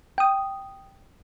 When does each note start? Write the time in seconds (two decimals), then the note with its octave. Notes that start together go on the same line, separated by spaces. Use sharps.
0.18 G5 D#6